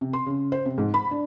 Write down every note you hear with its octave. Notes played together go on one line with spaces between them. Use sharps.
C3
C6
C#3
C5
C3
G#2
B5
D4